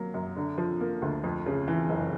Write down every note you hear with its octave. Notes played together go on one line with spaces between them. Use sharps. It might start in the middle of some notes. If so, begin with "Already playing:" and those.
Already playing: F#3 A#3
F#2
D3
F3
A#3
D2
F2
C#3
E3
F#1